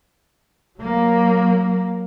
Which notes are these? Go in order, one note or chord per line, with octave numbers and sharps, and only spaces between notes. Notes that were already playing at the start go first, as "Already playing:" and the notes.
F#3 A#3